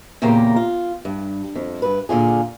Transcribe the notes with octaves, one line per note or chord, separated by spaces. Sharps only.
E2 A#2 C#3 A#3 G4 A#5
F4
G2
F2
G2 B4
A#2 D3 F4 G#4